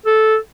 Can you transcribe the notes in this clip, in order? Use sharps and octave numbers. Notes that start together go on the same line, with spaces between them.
A4